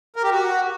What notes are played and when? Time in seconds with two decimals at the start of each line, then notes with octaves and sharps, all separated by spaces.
0.16 A#4
0.24 G4
0.31 F#4